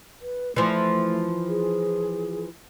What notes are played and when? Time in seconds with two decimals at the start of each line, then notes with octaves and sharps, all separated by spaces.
0.21 B4
0.56 E3 F3 A3
1.48 G#4